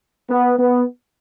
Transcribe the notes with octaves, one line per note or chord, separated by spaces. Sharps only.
B3
B3